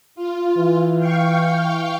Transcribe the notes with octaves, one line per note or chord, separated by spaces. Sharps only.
F4
E3
F5 G5 C#6